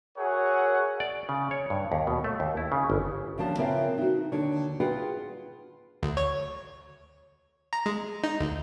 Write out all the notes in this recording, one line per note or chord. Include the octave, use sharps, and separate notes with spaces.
F#4 G#4 A#4 C#5 E5 F#5
D5
C#3
C#5
G2
D#2
B2
A3
D#2
E4
C#3
G1
D#2 D3 F3 C#4 A5
C#3 E3 C4 F4 A#4
D#4 F#4
D#2 D3 C#5
F4 G#4 B4 F#5 G5
D2
C#5
A#5
G#3
D#4
D2